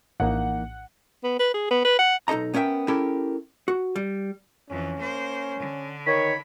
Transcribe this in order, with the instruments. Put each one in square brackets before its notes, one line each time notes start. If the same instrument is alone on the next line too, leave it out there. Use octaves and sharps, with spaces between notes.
[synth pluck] A#1 A2 [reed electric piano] E3 A#3 D#4 [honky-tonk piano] F#5
[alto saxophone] B3
B4
G#4
B3
B4
F#5
[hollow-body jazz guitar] B1 D#4 A4 D#5 A#5
B3 C#4 A#4 E5 G5
C#4 E4 G4 A4 A#4
F#4
G3
[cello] F2 E3 [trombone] C#4
[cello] A#3 C5
D3
[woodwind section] D#3 C#5 [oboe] B5